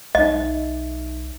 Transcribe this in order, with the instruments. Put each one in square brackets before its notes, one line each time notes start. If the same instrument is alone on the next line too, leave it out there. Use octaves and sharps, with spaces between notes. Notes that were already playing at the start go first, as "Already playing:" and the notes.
[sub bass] B1 [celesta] D#4 E5 [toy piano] D#5